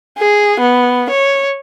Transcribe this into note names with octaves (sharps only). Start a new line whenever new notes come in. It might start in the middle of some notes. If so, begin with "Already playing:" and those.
G#4
B3
C#5